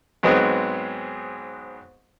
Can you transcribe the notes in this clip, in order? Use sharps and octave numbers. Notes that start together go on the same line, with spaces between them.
G#2 F#3 G#3 B3 C4 G#4